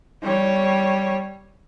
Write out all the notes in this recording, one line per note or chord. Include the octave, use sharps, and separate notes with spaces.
G3 C#5